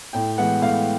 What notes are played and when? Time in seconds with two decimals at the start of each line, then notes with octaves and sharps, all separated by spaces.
0.13 A2 G5
0.38 E3 G#3 B3 F#5
0.62 A2 F5